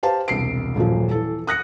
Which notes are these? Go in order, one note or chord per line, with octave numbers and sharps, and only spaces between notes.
G4 B4 C5 F5 A5
E1 C2 C7 D7
D#1 F#2 A#2 F3
E3 A4
D#6 F#6 A#6 C#7